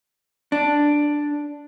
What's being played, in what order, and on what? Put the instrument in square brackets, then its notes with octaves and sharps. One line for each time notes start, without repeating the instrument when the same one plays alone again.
[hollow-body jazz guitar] D4